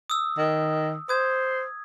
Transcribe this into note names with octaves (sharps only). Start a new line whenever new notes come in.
D#6 E6
D#3
C5 D#6 G#6